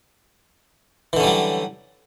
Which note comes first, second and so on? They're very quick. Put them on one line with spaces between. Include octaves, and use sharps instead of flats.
E3 D3 C#4 G3 F#3